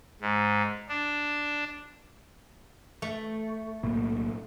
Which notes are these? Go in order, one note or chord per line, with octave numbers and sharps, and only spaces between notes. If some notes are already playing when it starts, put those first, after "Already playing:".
G#2
D4
A3
B1 A2 A#3